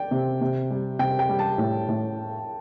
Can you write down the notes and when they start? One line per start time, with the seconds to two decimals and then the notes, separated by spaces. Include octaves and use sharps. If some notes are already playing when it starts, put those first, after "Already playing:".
Already playing: D5 G5
0.11 C3
0.41 C3
0.70 G3
0.99 C3 G5
1.19 G5
1.29 G3
1.39 A5
1.58 A2
1.88 A2